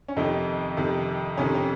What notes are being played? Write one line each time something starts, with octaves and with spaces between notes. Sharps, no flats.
C#4
F2 C3 D#3 D#4
F2 C3 D#3
F2 C3 D#3 C#4
C#4